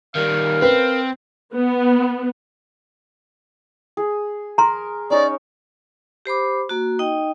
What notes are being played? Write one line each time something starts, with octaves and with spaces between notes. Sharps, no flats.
D#3 G3 A#4 F5
C4 B4
B3
G#4
A#4 A#5 C6
C#4 D#4 C#5 D5
G4 C5 B5 D6
A#3 F#4
D#4 D#5 G5